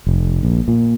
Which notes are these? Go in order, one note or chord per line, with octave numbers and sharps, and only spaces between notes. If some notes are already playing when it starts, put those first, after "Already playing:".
F1
A#1
A#2